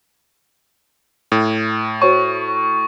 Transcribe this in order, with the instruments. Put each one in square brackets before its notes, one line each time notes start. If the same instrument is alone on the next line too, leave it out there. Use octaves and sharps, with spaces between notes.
[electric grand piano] A2
[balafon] F#4 C5 C#5 [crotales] C#6